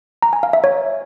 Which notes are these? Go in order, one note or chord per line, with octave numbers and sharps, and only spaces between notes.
A#5
G#5
F5
E5
C#5